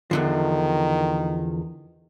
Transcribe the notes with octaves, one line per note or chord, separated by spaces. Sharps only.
E2 D3 D#3 F3